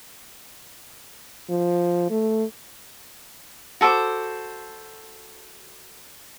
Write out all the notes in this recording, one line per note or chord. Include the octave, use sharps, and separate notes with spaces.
F3
A3
F#4 A4 C5 D6